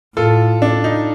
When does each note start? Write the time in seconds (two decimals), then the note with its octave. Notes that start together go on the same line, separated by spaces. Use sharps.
0.17 A2 F4 A4
0.62 D4
0.84 D#4